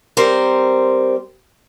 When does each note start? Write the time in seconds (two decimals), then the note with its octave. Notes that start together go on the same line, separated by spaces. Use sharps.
0.17 G3 C4 A#4 C5